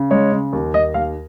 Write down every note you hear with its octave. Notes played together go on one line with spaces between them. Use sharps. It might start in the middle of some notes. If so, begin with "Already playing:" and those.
Already playing: C#3
G#3 C#5
C#3
D#2
D#2 D#5
D#2 F5